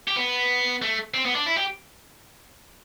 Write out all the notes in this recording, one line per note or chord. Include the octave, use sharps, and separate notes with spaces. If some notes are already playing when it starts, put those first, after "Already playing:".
G4
B3
A3
C4
B3
D4
E4
G4